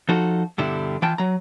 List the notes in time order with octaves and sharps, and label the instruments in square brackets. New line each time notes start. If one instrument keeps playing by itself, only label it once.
[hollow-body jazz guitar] F3 D#4 F#4 A4
G2 B2 D3 G3 E4
E3 F4 G5 A5
F#3 A#5